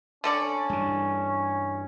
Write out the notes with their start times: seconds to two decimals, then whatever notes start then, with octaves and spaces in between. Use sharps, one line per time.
0.24 D3 C#4 A4 D5
0.70 G2 E3